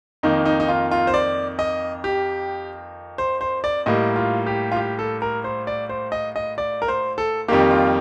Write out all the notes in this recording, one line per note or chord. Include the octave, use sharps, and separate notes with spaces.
F2 D#3 A#3 D#4
D#4
D#4
F4
F4
C5
D5
D#5
G4
C5
C5
D5
A2 G3 A#3 D#5
F4
G4
F4
G4
A4
A#4
C5
D5
C5
D#5
D#5
D5
A#4
C5
A4
F2 D#3 G3 A#3 G4
F4